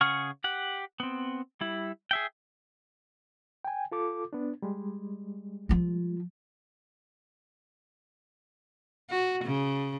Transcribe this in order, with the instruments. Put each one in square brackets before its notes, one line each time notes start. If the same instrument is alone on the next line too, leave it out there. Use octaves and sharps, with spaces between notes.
[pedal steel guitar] C#3 G#4 F#5 C#6 F6
G4 F#5
B3 C4
G3 E4
G#4 E5 G5
[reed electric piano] G5 G#5
F4 A4 D6
B3 D4
G3 G#3
[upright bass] F3 F4
[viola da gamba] F#4
C#3